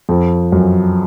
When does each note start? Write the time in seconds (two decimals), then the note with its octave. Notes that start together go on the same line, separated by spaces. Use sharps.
0.09 F2
0.52 F#2